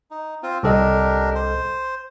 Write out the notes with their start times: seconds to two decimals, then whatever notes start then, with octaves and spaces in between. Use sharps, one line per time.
0.11 D#4
0.43 C4 F4
0.63 C2 D4 G4 A4 A#4 D#5
1.35 C5